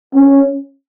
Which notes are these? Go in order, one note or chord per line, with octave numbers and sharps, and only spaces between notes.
C#4